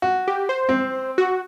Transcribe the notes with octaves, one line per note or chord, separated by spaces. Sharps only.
F#4
G4
C5
C4
F#4